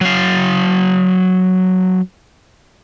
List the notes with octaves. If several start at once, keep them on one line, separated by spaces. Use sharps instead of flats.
F#3 F5